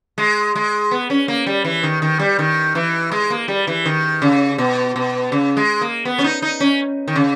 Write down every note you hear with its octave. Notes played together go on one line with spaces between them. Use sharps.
G#3
G#3
B3
C#4
A#3
G3
E3
D#3
D#3
G3
D#3
E3
G#3
A#3
G3
E3
D#3
C#3
B2
B2
C#3
G#3
A#3
B3
C#4
D#4
D#4
C#4
D#3
C#3